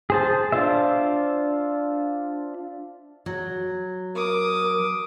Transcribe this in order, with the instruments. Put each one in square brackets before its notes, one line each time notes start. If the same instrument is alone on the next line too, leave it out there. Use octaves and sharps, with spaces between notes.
[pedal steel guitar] G#4 C5 A5
D4 F4 C5 E5
[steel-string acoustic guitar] F#3
[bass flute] A#4 [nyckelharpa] D6 D#6